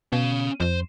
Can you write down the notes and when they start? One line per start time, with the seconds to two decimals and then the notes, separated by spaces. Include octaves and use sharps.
0.12 B2 C#4 F5
0.60 F2 C5